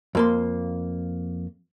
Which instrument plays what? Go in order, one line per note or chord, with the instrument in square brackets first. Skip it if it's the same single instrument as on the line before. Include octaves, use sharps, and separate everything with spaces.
[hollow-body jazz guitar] F2 A#3 C6